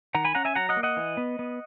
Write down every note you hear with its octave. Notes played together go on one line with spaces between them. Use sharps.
D#3 F#5 A#5
G#5 B5
C#4 F#5 A#5
E5 G#5
F#3 F#5 A#5
D#5 F#5
A#3
D#5 F#5
E3
B3
B3